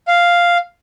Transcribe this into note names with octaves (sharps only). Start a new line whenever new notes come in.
F5